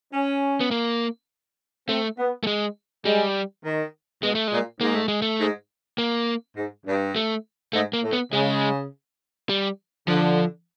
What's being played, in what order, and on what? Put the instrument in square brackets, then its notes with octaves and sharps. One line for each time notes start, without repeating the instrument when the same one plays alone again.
[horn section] C#4
[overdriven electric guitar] B3
A#3
[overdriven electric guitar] A3 [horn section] C4
[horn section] B3
[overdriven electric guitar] A3
G#3
[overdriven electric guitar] G3 [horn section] G#3
[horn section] D#3
[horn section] B2 [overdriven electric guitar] G#3
[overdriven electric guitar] A3
[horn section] A#2 [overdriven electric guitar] G#3
[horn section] G#2 [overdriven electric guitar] A#3
[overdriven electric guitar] A3
G#3
A3
[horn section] G#2
[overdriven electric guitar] A#3
[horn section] G#2
G2
[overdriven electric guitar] A3
[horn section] G#2 [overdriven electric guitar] A3
[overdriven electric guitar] A#3
[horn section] A2
[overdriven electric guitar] B3
[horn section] C#3 [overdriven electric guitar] G#3
[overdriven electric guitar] G3
[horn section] D3 [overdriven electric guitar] F3